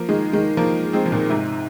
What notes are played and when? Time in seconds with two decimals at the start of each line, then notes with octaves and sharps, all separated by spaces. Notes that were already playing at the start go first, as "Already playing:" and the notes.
Already playing: F3 A#3
0.09 D#3 G#3
0.33 D#3 G#3
0.57 F3 A#3
0.93 G#3 C4
1.06 F3
1.12 A#2 D#3
1.30 G#2 C3